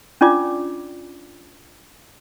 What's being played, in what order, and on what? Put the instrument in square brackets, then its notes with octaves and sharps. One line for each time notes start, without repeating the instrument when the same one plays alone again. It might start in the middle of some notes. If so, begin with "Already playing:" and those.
[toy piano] C#4 D4 F4 D5 D6